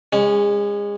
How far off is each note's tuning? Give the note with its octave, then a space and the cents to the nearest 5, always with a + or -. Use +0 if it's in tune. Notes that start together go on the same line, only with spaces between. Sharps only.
G#3 -30 C#4 +0